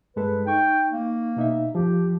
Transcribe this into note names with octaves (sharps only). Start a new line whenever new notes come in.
G2 G#3 A4 B4
D#4 G5 C#6
A#3
B2 D#4 E5
F2 F3 G4